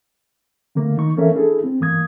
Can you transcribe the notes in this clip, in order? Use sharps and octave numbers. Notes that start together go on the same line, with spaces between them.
D3 A3 A#3
D#3 D#4 C#6
E3 A#3 C#4 A4 A#4 E5
D4 E4 G#4 A4
C4
G2 E3 A#3 D#6 G#6